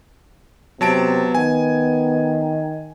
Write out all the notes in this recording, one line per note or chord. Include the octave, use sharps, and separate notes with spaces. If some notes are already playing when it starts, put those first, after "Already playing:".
C3 F#3 B3 A5 D7
D#3 G#5